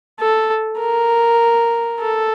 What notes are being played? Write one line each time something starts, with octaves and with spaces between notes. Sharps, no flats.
A4
A#4
A4